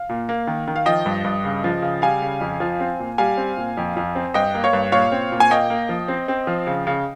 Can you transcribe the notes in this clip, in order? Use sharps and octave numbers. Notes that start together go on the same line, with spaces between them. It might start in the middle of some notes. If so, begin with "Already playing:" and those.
Already playing: F5
A#2
A#3
D#3
D#3
F5
F3 D#5 G5
G2
G2
C#3
F3
C#3
G3 F5 G#5
C#3
F2
F3
C4
A#2
G3 F5 G#5
C4
A#2
F2
F2
C4
G2 D#5 G5
A#3
C#5 F5
G2
A#2 C#5 F5
C4
A#2
G#5
A#3 D#5 G5
A#3
F3
C4
C4
F3
C#3
C#3